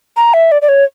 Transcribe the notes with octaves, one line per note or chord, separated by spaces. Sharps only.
A#5
E5
D5
D5
C#5